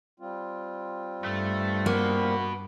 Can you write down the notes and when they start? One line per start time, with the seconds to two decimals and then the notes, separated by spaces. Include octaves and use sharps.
0.20 G3 C4 F4
1.25 G2 A3
1.86 A#3 F#4 B4